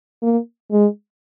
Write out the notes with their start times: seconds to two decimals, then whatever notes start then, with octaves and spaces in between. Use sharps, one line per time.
0.23 A#3
0.72 G#3